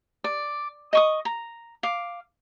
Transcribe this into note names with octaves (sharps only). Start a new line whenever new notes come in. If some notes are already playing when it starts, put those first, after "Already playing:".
D5
D#5 C#6 D#6
A#5
F5 D6